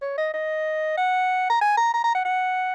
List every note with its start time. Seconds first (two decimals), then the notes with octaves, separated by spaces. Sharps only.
0.02 C#5
0.18 D#5
0.34 D#5
0.97 F#5
1.50 A#5
1.61 G#5
1.77 A#5
1.94 A#5
2.04 A#5
2.15 F#5
2.25 F#5